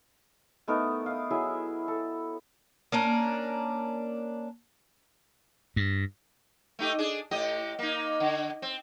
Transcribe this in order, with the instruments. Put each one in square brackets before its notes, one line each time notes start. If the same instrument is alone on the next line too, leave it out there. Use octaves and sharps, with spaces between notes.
[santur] A3 B3 D#4 A#4
F5 D#6
F#3 E4 G#4 E5
A4
[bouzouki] A#3 C#4 D4 A#4
[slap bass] G2
[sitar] A3 D#4 G4
D4 G#4
A2 G4 D#5
A#3 D#4
D3
C4